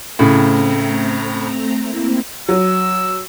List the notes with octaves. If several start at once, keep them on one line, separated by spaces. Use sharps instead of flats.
A2 C#3 A3 C4 A#5
A#3 C4 E4
F#3 E6